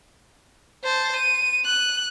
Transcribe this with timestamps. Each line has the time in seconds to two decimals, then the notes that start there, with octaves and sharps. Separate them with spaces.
0.84 C5 A5
1.16 D#7
1.65 F#6